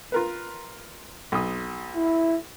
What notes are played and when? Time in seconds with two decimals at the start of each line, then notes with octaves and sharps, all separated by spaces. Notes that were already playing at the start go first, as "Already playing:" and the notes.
0.12 F4 A#4 B4
1.32 B1 D#6
1.94 E4